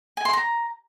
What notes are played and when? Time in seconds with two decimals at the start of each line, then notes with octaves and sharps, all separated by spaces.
0.17 G#5
0.25 C6
0.33 A#5